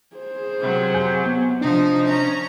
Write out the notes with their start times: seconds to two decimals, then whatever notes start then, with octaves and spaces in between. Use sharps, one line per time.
0.16 G#4 C5
0.59 C3 F#3
0.94 F2 G#5 G6
1.26 B3
1.61 C3 F3 D4 D#4 C5
2.06 C#4 A#5